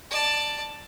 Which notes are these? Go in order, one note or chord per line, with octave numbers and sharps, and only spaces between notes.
D5 A5